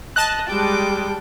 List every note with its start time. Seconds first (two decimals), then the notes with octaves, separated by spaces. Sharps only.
0.16 D#5 A5 F#6
0.49 G3 G#3 G5 D6